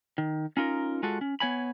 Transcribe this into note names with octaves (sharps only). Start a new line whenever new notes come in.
D#3
C#4 D#4 F4 A#4
G#3 F4 F#4 A4
C#4
B3 C#5 G#5 B5